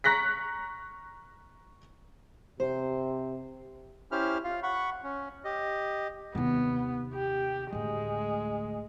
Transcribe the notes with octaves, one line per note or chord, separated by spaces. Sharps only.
A#5 C#6 F#6 A#6 B6
C3 C5
C#4 E4 G4 C5 F6
F4 F5
F#5 B5 C#6
C#4
G4 D#5
D#2 C3 B3
G4
D2 A2 G#3